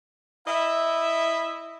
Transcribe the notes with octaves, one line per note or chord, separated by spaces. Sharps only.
E4 D#5 E5